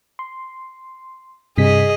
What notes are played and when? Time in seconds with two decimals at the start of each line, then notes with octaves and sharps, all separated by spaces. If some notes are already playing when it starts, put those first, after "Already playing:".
0.19 C6
1.58 G2 C3 G#4 D#5 B6